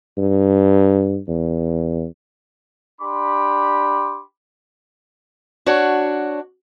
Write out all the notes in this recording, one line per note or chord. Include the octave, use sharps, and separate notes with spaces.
G2
E2
D4 G4 B5 C6 D6
D4 F#4 C#5